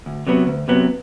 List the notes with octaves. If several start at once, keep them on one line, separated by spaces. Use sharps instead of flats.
D2
C3 F#3 B3
D2
C3 F#3 B3